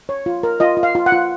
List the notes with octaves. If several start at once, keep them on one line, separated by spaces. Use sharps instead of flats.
C#5
F4
A#4
F4 D#5
F4
F5
F4
F#5
F4